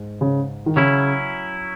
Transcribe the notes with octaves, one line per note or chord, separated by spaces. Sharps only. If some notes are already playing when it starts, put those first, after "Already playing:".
Already playing: G#2
C#3
D#3
C#3 F#3 C#4 E4